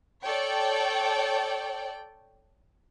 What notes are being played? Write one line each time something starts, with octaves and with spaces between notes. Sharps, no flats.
A4 C#5 D5 G5